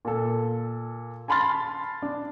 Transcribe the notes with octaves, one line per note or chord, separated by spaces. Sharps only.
A#2 A4
G#5 A5 B5 C6 F6 A6
D4